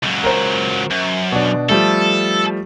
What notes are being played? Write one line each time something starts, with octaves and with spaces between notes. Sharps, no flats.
C#2 F#3
A#4 C5
F#2
B2 D4
F3 G3 A3 A4